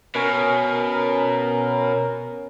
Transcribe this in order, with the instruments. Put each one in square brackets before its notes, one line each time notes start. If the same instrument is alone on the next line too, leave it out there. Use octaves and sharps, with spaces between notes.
[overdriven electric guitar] B2 [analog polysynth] C#4 A#4